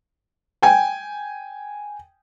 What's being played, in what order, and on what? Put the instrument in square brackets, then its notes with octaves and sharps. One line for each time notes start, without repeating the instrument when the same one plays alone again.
[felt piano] G5 G#5